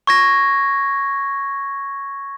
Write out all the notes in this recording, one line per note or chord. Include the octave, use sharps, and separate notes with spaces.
C#6 G#6 A#6